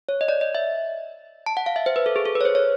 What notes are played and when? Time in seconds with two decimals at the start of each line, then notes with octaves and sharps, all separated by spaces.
0.09 C#5
0.21 D#5
0.28 D5
0.41 D#5
0.55 E5
1.46 A5
1.57 F#5
1.66 F5
1.76 E5
1.86 C5
1.96 B4
2.06 A4
2.16 G#4
2.26 A4
2.35 B4
2.41 C#5
2.45 C5
2.55 C#5